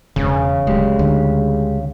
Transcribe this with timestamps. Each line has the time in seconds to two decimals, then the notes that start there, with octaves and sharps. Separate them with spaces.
0.16 E1 C#3
0.67 D1 G#3 G4
0.99 D2